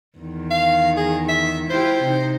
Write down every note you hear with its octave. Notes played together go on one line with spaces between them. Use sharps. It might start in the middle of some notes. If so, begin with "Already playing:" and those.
E2 D#3
F5
G#4
E5
E4 F4 G4 C5
C3 D#4